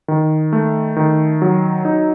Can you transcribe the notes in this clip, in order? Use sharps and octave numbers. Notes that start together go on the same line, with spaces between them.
D#3
A3
D#3
F#3
D#4